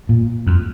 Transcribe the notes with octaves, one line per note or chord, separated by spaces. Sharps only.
A#2
F2